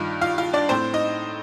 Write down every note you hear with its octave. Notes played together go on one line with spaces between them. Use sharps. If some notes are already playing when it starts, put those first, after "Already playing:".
Already playing: G2 D#3 F4
F4 F5
F4 F5
D4 D5
A2 C4 C5
D#4 D#5